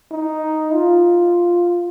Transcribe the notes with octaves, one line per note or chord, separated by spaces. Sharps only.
D#4
F4